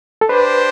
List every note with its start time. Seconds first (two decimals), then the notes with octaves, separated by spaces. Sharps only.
0.21 A4
0.29 D4 G4 B4 C5